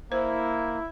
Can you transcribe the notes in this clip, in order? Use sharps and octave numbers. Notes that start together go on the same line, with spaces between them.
A#3 E4 C5